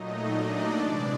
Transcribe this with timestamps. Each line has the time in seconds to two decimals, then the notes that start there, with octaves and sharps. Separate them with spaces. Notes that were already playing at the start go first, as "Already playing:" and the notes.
Already playing: A#2 F#3 A3 D#4 D#5
0.32 D4 D5
0.80 C3 E3 G#3 D4 D5